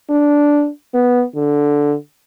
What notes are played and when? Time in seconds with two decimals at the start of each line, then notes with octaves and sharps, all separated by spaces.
0.10 D4
0.94 B3
1.36 D3